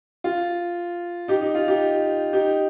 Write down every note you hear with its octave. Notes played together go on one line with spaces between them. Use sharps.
F4
D#4 G4
D#4
F4
D#4 G4
D#4 G4